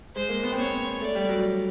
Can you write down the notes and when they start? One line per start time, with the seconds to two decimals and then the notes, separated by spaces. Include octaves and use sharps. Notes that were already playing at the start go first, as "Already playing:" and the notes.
0.16 G#3 C5
0.29 A#3
0.43 B3
0.52 C4
0.59 B3 C#5
1.01 A3 D5
1.15 G3
1.29 F#3